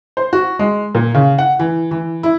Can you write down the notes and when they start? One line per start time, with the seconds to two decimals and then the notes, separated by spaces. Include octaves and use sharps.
0.17 C5
0.33 F#4
0.59 G#3
0.95 A#2
1.14 C#3
1.38 F#5
1.59 E3
1.91 E3
2.23 E4